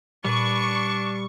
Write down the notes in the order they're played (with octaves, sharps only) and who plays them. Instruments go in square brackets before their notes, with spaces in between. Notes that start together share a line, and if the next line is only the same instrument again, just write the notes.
[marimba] A#2 [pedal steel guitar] G3 B4 [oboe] D4 [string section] C#6